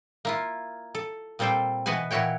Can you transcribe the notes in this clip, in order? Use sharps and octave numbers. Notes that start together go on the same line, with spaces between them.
A#3 E4 F4
A4
A#2 G3 C4 A4 C5 G5
B2 E3 B3 F#4 B4 G#5
A#2 E3 E4 F#4 C#5 G5